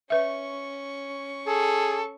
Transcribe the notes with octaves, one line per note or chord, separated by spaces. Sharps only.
C#4 B4 E5 C#6
G#4 A4